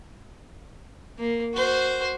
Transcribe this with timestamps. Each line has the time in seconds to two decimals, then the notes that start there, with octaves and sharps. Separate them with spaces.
1.18 A#3
1.55 F#4 C5